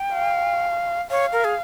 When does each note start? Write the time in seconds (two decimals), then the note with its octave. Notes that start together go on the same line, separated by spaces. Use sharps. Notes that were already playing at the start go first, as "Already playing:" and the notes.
Already playing: G5
0.13 F5
1.10 C#5 F5
1.33 A#4
1.44 G#4